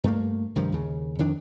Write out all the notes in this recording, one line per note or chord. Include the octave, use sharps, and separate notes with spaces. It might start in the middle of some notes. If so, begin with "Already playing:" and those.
G2 A3 A#3
C2 G2 D#3 F3
D#2 C#3
F2 D#3 D4